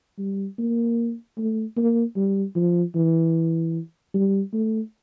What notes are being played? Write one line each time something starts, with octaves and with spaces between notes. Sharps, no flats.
G3
A#3
A3
A#3
G3
F3
E3
G3
A3